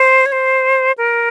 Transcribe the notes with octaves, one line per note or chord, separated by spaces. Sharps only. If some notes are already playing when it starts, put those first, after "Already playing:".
Already playing: C5
C#5
C5
A#4